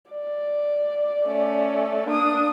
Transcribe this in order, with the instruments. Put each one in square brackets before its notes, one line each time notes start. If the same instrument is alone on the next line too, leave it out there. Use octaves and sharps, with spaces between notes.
[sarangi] D5
[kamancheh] A3 C#4
[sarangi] A#3 [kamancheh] D4 D#6